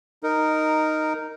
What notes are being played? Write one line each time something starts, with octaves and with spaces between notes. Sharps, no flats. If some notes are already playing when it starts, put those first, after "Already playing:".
D#4 A#4